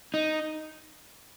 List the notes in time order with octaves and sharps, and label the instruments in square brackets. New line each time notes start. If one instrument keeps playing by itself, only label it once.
[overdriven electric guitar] D#4